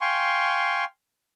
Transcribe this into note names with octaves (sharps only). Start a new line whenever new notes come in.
F5 G5 G#5 C6 C#6